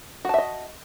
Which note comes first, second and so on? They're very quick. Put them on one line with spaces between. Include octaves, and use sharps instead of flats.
F#4 A5 E5 D#5